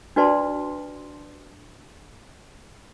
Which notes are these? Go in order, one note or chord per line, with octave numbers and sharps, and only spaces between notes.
D4 F#4 B4 D5 A5 C6